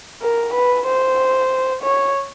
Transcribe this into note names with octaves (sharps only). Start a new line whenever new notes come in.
A#4
B4
C5
C#5